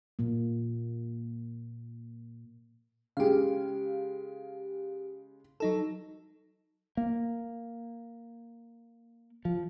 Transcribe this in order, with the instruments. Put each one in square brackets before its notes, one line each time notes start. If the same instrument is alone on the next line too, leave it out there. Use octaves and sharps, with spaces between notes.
[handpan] A#2 A#3
[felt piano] C#3 G#3 [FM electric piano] G4 F5
[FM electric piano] F#3 D#4 A4
[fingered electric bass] A#3
F3